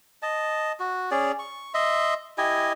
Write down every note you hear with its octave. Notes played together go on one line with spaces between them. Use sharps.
D#5 A5
F#4
C#4 G#4 D5
C#6
D#5 E5 C6
E4 G4 D#5 G#5